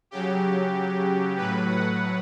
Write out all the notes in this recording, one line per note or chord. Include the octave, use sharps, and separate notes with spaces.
C#3 F#3 G4
A2 F#3 B4
F#5